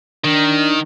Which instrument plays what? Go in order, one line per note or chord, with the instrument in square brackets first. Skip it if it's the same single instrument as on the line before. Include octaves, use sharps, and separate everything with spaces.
[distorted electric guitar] D#3 [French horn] D4